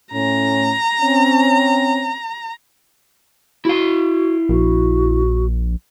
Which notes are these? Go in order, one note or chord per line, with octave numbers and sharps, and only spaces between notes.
A2 C#4 A#5
C4 C#4
E4 F#4 F5
A#1 F#4